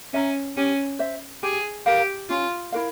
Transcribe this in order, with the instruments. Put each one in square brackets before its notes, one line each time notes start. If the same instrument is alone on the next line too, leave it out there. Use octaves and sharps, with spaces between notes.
[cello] C#4 [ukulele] E5 A#5
[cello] C#4 [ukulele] G4
[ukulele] C5 E5
[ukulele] G4 [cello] G#4
[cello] G4 [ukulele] A#4 F5
[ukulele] C#4 [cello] F4
[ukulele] E4 A#4 F5